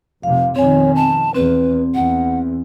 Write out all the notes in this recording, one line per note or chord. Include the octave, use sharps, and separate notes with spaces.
F1 C3 F5
F2 B2 D#3 C4 C#5 G#5
A5
E2 C4 B4
E2 F#5